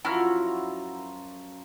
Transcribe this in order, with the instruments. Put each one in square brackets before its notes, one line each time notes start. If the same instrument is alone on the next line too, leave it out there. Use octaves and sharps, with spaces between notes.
[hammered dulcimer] F#2 F3 A#5 [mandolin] E4 F#4 F6